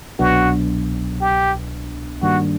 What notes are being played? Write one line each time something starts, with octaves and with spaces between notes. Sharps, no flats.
C2 B2 F#3 B3 D4 F#4
G4
G2 D#3 G3 A#3 D4 F#4